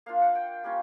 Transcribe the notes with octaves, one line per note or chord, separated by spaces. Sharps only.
A#3 D4 F4 F5
F#5
G5
G3 A#3 C#4 F4